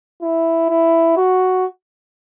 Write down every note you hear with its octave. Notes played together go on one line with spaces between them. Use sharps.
E4
E4
F#4